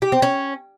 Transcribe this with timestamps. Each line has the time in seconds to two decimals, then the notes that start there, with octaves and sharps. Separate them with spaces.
0.02 G4
0.12 C4
0.22 C#4